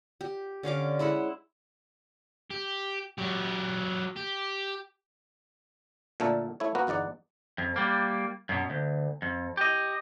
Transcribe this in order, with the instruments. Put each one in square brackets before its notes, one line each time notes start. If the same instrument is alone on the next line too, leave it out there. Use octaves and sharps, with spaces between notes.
[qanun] G4
D3 C#4 F5 D6
G#3 E4 E5 F#5
[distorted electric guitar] G4
F#3 G4
G4
[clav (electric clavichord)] A#2 D3 A3 A4 A#4
A3 E4 C#5
A#3 B3 F#4 A#4 B4
G1 E2 D#4 D5 F#5
[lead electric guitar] F2
G3 A#3
F#2 B2
D2
F2
G4 D#5